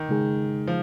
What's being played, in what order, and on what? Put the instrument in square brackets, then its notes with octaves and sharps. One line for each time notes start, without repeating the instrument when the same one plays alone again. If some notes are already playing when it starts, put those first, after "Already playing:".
Already playing: [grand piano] D#3
[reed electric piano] C#3 G#3 D#4 G#4
[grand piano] F3